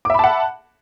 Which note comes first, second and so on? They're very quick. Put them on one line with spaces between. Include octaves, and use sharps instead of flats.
D6 E5 B5 A5 F#5